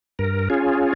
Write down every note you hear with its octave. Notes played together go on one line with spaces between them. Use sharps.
G2 A#4
C#4 F4 G#4